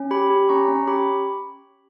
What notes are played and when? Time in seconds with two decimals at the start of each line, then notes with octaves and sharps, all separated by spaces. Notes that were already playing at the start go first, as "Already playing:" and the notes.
Already playing: C#4
0.11 G4 B5 D6
0.30 G4
0.49 C#4 A#5 C#6
0.68 C#4
0.87 G4 B5 D6